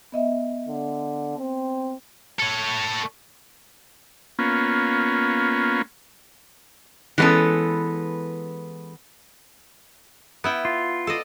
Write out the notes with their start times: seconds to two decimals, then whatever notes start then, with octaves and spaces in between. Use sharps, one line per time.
0.12 B3 D#5 E5
0.68 D3
1.38 C4
2.40 A4 C#5
4.39 A#3 B3 C#4 F4
7.18 E3 G#3 B3 C#4 A4
10.44 B3 E4 G5
10.65 F4
11.07 A4 D5 D#5